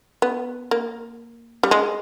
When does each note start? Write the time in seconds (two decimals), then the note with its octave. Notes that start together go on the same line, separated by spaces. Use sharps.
0.22 B3
0.71 A#3
1.63 G3
1.71 G#3